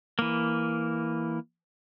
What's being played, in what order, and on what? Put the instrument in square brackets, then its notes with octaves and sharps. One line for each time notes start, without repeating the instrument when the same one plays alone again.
[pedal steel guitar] E3 A#3